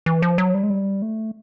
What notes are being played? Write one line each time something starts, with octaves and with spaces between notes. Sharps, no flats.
E3
F3
F#3
G3
G#3
G3
A3